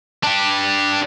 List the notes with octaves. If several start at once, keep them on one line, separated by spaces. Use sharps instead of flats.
D4 G4